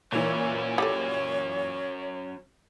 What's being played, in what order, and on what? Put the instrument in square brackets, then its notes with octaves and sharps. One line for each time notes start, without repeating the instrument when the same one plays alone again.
[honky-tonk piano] A#2 E3 [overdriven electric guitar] F#3 C#4 [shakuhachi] C#5
[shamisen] G3 G4 A4